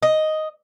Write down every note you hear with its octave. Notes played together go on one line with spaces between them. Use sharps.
D#5